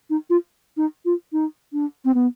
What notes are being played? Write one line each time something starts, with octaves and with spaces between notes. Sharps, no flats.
D#4
F4
D#4
F4
D#4
D4
C4
B3